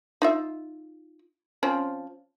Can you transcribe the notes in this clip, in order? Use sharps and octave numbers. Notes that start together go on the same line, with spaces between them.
D#4 F4 E5
F3 C4 C#4